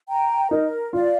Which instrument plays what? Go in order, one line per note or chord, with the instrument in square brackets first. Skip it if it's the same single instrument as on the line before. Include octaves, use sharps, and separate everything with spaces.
[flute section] G5 A#5
[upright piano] D#4 [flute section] A#4
[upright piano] F4 [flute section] D5 F5